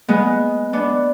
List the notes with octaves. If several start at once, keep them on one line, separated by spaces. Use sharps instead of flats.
G#3 B3
B3 D4